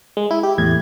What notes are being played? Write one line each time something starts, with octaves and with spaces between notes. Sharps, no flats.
G#3
E4
G4
E2 A2 G#6